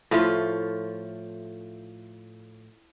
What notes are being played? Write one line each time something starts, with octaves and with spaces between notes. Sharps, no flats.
A2 F3 A3 F4